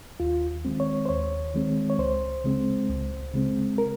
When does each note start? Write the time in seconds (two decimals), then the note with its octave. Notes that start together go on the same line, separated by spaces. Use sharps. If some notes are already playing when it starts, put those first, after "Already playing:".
0.20 D#2 F4
0.65 D#3 G#3 C4
0.80 C#5
1.06 C5
1.09 D#2 C#5
1.54 D#3 G#3 C4
1.90 C#5
1.98 C#2 C5
2.44 C#3 G#3 C4
2.89 C#2
3.34 C#3 G#3 C4
3.78 A#4